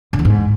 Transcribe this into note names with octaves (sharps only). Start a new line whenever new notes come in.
D3
E2
G#2